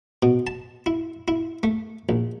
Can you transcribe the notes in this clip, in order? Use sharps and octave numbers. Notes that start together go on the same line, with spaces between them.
B2
A5
E4
E4
A3
A#1